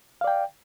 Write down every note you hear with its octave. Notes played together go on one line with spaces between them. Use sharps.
D5 F5 G5